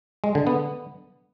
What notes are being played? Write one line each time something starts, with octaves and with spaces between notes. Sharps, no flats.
G#3
D3
B3